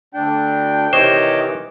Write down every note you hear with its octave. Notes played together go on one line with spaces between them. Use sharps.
D2 D4 G5
C3 D#3 E3 C5 C#5 D#5 D6